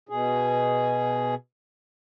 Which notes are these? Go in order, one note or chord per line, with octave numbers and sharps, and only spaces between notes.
B2 G#4